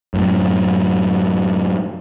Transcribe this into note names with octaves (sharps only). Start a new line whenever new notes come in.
F#2 A2